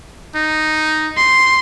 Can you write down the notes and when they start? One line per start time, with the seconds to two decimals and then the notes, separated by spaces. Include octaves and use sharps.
0.35 D#4
1.17 C6